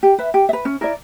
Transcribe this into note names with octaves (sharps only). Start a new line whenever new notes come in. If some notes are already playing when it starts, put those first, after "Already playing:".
G4
B4 E5
G4
E5
B4
C#4
E4 A#4 D5